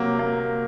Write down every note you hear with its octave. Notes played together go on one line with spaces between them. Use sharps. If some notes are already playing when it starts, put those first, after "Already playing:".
Already playing: C3 F#3 A#3
A#3